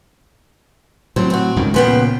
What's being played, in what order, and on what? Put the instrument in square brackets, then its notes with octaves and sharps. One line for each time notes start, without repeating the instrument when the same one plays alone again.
[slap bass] A2 F#3 [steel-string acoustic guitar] C4
[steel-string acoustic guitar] C4 F#4
[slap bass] C#2 G2 D#3
[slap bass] A#2 C#3 [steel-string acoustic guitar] F3 B3 G5